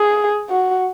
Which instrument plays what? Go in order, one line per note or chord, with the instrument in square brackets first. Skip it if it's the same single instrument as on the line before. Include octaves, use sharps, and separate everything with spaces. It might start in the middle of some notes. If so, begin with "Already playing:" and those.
Already playing: [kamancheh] G#4
F#4